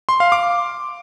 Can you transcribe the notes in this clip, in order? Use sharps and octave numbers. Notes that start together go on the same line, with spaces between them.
C6
F5
D6